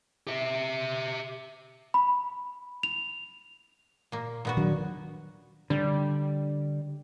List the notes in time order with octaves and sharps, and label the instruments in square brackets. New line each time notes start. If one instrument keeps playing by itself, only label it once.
[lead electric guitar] G4 E5
[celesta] B5
F7
[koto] A#2 A#3
A#2 B3 F#4
[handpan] D#3 F#3 D4
[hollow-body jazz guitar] D3 [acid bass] G3